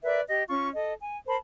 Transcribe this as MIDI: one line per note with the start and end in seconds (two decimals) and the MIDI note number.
0.03 0.21 70
0.03 0.21 71
0.03 0.21 74
0.03 0.21 76
0.28 0.43 67
0.28 0.43 75
0.49 0.69 61
0.49 0.69 65
0.49 0.69 85
0.74 0.93 69
0.74 0.93 75
1.00 1.16 80
1.27 1.36 70
1.27 1.36 72
1.27 1.36 81
1.27 1.36 83